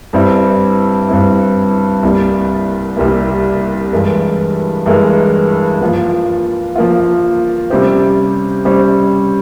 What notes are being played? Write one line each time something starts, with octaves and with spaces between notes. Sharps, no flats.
G2 G3 C4 E4
G2 G3 C4 E4
C2 C3 G3 A#3
C2 C3 G3 A#3
G2 E3 G#3 E4 A#4
G2 E3 G#3 E4 A#4
F3 A#3 F4
F3 A#3 F4
C3 G3 C#4 G4 C5
C3 G3 C#4 G4 C5